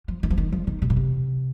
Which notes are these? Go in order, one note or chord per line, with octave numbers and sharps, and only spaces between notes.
F3
D#3
F3
D#3
F3
D#3
C3
A#2
C3